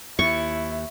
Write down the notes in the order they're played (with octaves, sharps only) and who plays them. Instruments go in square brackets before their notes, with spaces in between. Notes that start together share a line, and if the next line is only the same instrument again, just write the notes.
[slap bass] D#2 [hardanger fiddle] E4 [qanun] C#6